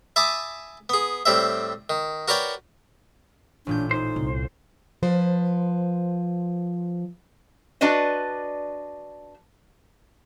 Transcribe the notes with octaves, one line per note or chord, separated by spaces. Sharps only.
E5 G#5 A5 B5 D6 D#6
B3 G#4
A2 G3 C4 E5
D#3
F#4 A#4 B4 C#5 D5 G5
A1 A#2 D4 G6
D#4 C5
C2
F3 B4 C5
D4 F#4 B4 D5 D#5